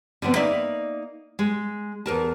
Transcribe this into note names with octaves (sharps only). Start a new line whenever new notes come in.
D3 F3 B3 C4
A#3 D#4 D5 E5
G#3
E2 A#4 A5